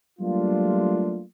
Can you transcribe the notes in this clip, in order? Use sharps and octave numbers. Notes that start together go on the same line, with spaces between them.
F#3 G3 A3 A#3 D4 F4